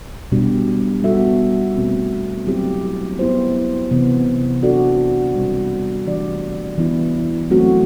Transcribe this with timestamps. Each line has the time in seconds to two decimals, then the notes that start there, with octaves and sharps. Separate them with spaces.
0.32 B2 G3 D4 G4
1.03 G3 B3 F#4 A4 E5
1.75 B2 A3 C4 F#4
2.47 F#3 C4 E4 G4
3.19 B3 E4 G4 C5
3.91 C3 E3 B3
4.62 B3 D4 F#4 A4 D5
5.34 B2 G3 C4
6.07 E3 A3 D4 G4 D5
6.78 E3 B3 E4
7.50 F#3 A3 C4 F#4